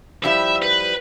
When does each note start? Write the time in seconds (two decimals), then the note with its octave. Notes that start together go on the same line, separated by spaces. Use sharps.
0.24 F3 G3 E4 E5
0.62 B4